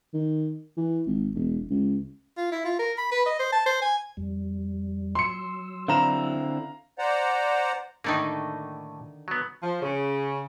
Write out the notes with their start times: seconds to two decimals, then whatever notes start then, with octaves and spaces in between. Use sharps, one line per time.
0.14 D#3
0.77 E3
1.07 G#1
1.35 E1
1.70 C#2
2.37 F4
2.52 E4
2.65 F4
2.79 A#4
2.98 B5
3.12 B4
3.26 D#5
3.39 C5
3.52 A5
3.66 C5
3.82 G#5
4.17 F2 G3
5.15 F#3 C6 E6 C#7
5.88 D3 C4 E4 F5 A#5 E7
6.99 C5 D5 F#5 A#5
8.04 A2 D3 D#3 A3 A#3 D#4
9.28 F#3 B3
9.63 F3
9.82 C#3